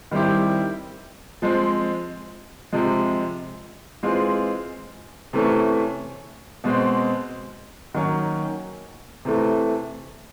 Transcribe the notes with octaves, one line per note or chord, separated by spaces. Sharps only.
D#3 G3 C4 E4 G4
F3 G#3 C4
C3 F3 G#3
E3 G#3 C4 F4 G#4
C3 E3 A3 C#4
B2 G#3 C4
D#3 F#3 A#3 C#4
C3 E3 A3